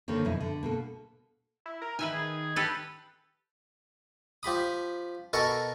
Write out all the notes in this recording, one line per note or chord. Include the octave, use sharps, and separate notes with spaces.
D3 D#3 A#3 C4 C#5
F2 B2 E4 D#5
D3
B2 A#3 A4
E4
A#4
D#3 B4 E5 G#5
G#4
G4 A4 B4
F3 G4 B5 D#6
B2 A4 A#4 G#5 C#6